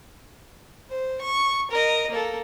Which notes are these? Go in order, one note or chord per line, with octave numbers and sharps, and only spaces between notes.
C5
C#6
A#4 D#5
A#3 A4